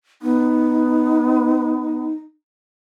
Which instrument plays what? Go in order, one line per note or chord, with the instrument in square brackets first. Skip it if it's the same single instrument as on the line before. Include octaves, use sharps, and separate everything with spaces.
[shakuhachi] B3 [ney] D#4